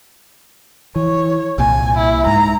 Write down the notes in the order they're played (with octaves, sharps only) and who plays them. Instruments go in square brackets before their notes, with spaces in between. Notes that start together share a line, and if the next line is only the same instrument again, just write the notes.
[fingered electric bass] E3 [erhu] C#5
[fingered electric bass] C2 A#2 [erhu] G#5
[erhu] E4
[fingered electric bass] G#2 [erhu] A#5